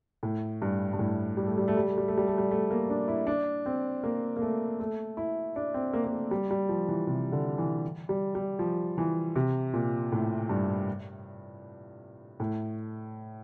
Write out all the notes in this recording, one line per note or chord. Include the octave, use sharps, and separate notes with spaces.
A2
G2
G2
A2
G3
A3
G3
A3
G3
A3
G3
A3
G3
A3
G3
A3
A#3
D4
E4
D4
C4
A#3
A#3
A3
A3
E4
D4
C4
A#3
A#3
A3
G3
G3
F3
E3
C3
D3
E3
G3
G3
F3
E3
C3
A#2
A2
G2
A2